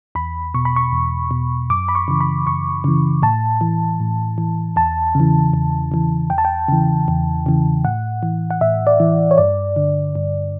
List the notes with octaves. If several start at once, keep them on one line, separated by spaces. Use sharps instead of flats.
E2 B5
B2 C#6
B5
C#6
E2
B2
F#2 D6
B5
C#6
C#3 E3
B5
F#2 C#6
C#3 E3
A2 A5
E3
A2
E3
E2 A5
C#3 E3
E2
C#3 E3
E2 G5
A5
G5
C#3 E3
E2
C#3 E3
A2 F#5
E3
F#5
A2 E5
D5
E3
C#5
G2 D5
D3
G2